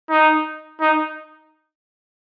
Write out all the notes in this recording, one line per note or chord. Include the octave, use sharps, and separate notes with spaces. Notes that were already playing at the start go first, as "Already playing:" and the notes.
D#4
D#4